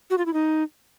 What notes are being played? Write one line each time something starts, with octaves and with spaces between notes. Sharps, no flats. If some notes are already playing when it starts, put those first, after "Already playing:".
F#4
F4
E4
D#4